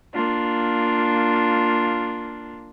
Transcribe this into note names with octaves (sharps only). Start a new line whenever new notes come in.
A#3 D4 F4